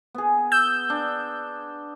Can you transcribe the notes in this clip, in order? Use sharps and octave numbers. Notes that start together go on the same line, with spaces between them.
B3 G#4
E6 G6
D4